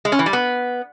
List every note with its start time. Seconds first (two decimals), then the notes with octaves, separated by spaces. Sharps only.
0.05 G#3
0.12 C#4
0.19 E3
0.26 G3
0.33 B3